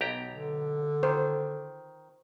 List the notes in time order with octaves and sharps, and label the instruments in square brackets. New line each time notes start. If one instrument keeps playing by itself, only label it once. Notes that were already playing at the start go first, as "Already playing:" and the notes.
[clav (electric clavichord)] B1 G4 A#5 [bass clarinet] B3
[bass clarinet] D3
[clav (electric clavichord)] D#3 [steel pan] C5